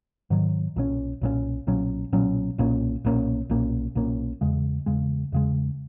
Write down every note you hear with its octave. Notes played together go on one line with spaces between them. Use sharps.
G#2 D#3 F#3
B1 A#2 F#3 C#4
B1 A#2 F#3 C#4
B1 A#2 F#3 C#4
B1 A#2 F#3 C#4
B1 A#2 A#3 C#4
B1 A#2 A#3 C#4
B1 A#2 A#3 C#4
B1 A#2 A#3 C#4
E2 C#3 G#3
E2 C#3 G#3
E2 C#3 G#3